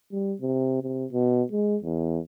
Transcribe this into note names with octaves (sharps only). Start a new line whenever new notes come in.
G3
C3
C3
B2
G#3
E2